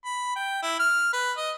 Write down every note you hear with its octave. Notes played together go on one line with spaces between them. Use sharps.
B5
G5
E4
F6
B4
D#5